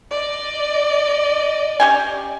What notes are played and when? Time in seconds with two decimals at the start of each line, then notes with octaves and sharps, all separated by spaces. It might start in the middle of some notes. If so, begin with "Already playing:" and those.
0.11 D5 D#5
1.80 C#4 G4 G#5